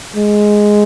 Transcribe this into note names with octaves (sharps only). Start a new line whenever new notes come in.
G#3